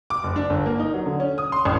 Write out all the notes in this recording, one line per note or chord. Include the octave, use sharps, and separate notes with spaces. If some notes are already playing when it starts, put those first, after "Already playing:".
D6
F#1
D4
G1
A#3
D#4
F#3
D3
C#4
D#6
C6
A1